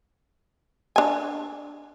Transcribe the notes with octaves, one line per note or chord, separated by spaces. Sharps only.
D4 G#5